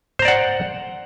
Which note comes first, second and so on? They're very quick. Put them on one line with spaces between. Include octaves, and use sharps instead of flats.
C5 A#5 D5 F#5